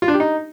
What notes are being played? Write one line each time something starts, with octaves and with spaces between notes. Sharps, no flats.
F4
D4
G4
D#4